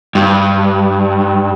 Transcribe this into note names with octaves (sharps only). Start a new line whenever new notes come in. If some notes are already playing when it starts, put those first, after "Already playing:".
G2